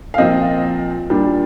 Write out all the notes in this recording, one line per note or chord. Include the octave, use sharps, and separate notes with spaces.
F5
A#2 F3 C4 D#5
A#2 G3 D4